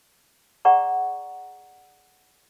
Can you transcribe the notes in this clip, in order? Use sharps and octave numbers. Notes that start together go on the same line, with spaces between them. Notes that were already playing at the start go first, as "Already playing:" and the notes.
G#4 D5 F#5 A#5 C#6